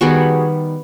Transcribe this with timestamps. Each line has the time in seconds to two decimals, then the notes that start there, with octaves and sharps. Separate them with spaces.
0.01 D#3 G3 B3 F#4 G#4